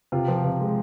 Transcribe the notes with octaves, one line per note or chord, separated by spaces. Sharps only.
C3 F4
F3
C3
G#3